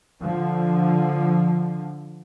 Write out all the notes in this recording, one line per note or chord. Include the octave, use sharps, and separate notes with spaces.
D3 F3